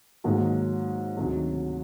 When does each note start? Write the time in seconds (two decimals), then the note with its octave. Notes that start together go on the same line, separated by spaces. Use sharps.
0.24 G#2 D#3 F#3 A#3
1.17 D2 C3 D#3 F#3